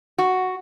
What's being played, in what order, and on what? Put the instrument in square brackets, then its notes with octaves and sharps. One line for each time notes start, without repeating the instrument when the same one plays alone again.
[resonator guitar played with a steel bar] F#4